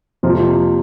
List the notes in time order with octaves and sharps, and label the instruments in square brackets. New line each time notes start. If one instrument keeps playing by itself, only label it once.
[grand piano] F2 C3 F3 A#3 F4